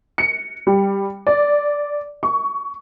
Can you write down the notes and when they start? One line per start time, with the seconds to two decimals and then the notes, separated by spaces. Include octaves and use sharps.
0.18 C#7
0.67 G3
1.27 D5
2.23 C#6